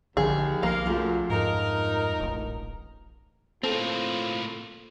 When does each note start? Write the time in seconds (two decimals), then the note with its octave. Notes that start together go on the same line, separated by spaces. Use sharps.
0.17 A#1 D#2 D3 F3 G#4
0.63 B1 F3 A#3 F4 A#4 F5
0.86 F#2 G#3 A3 F4
1.30 F2 G#2 D#4 A#4
2.19 D1 A1
3.63 A2 A#3 C4 F4 A4